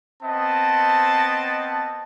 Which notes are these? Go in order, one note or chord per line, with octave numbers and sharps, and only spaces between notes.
B3 C4 D#5 A5